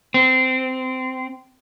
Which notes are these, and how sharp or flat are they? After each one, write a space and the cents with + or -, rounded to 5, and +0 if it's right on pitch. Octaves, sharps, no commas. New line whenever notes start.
C4 -20